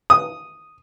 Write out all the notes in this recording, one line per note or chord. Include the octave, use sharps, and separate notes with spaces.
D#6